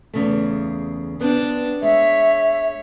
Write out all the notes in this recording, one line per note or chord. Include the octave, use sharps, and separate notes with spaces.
E2 C#3 A3
B3 C4 D4
G#3 C#5 E5